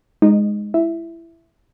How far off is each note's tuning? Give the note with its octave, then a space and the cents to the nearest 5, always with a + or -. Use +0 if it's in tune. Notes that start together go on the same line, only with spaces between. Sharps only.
G#3 +0 D#4 +0 D#5 -25
E4 +15 E5 +0